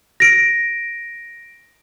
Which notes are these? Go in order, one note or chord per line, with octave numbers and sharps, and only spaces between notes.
A#6 D7